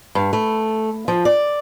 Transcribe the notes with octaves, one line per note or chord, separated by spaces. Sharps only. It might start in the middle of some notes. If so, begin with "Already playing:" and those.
G2
A3
F3
D5